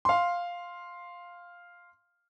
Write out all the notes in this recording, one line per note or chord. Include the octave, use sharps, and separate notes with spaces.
F5 C6